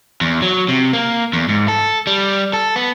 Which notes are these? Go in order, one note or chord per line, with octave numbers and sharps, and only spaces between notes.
E2
F#3
C3
A#3
E2
G#2
A4
G3
A4
B3